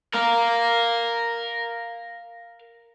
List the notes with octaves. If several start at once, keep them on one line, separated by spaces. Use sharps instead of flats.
A#4 F5